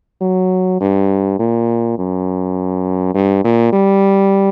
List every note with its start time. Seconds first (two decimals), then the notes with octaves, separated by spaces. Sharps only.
0.21 F#3
0.80 G2
1.39 A#2
1.98 F#2
3.14 G2
3.44 A#2
3.73 G3